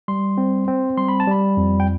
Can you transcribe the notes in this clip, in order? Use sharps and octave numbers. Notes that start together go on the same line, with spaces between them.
G3 C6
C4
C4
G3 C6
B5
A5
G3 B5
F2
G5